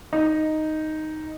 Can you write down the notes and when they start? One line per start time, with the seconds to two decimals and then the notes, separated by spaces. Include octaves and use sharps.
0.13 D#4